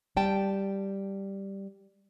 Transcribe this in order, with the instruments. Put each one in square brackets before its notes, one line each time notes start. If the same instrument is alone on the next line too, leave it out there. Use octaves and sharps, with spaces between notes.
[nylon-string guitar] G3 G5 A5